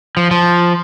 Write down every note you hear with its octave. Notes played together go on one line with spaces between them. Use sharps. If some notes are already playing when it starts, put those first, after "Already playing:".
F3
F3